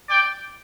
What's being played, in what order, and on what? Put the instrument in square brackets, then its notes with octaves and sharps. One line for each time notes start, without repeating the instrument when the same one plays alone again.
[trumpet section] D5 G5